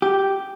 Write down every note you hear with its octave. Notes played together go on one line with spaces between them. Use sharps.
G4